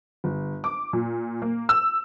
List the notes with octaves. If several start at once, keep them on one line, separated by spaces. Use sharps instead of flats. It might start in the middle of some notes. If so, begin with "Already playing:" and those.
G1
D6
A#2
A#3
E6